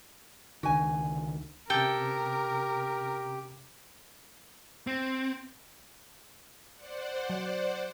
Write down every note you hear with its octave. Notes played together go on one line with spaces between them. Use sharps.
C#2 D3 D#3 F#4 G#5
C3 C#4 G4 A4 A#4 G5
C4
C5 D5 F#5
F#3